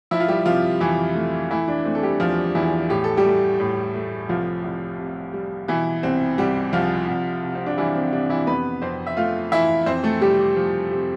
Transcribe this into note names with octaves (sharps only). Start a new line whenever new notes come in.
F3 E4 E5
F4
G3 G4
C3 F3 F4
F2 E3 E4
A3
E3 A3 E4
D4
A3 C4
A4
G3 G4
E2 F3 F4
E2 E3 E4
A2 G4
A4
G3 G4
A3
A2
A3
C2 F3 F4
C2
C3
G3
B2 E3 E4
C2 C4
C2 G3 G4
C2 F3 F4
C2
C3
C4
D4
E3 G3 E4
C4
C3 D4
E3 E4
F2 B3 B4
F2 C4 C5
E5
A3 F4 F5
E3 E4 E5
F2 C4 C5
A3 A4
C3 G3 G4
F3
C3